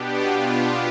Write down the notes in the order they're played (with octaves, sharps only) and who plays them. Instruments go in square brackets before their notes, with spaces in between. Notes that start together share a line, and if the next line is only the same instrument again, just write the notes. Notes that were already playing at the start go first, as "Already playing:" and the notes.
Already playing: [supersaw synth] B2 B3 D4 G4
F4